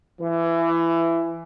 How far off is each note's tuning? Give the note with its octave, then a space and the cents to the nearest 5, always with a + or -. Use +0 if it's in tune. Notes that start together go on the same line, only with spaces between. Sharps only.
E3 +20